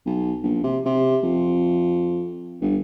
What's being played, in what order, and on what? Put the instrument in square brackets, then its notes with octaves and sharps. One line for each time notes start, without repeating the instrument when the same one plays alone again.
[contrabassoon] B1
A#1
C3
C3
F2
G1